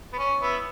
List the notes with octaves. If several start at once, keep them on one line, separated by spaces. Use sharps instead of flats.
B3
C#4
B3 E4